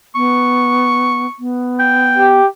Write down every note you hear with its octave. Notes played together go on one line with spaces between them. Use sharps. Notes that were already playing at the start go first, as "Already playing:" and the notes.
B3 C#6
B3
G5
G4